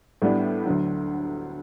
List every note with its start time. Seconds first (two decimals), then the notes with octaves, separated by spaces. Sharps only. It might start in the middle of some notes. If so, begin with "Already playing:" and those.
0.22 A2 G3 B3 D4
0.65 D2 D3 F#3